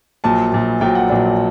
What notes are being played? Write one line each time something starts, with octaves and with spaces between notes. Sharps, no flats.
A#1 A#2 F#3 A5
A#1 A#2 F#3
A#1 A#2 F#3 G5
F#5
A#1 A#2 F#3 D5